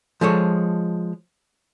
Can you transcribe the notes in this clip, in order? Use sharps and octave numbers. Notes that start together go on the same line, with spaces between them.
F3 G#3 A4 C#5